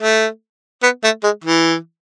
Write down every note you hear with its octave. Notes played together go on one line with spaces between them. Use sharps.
A3
B3
A3
G#3
E3